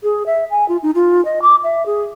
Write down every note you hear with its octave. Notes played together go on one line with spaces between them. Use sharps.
G#4
E5
G#5
F4
D#4
F4
D#5
D6
E5
G#4